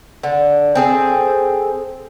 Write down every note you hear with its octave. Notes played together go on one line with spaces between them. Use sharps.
D3
C4 G#4 A4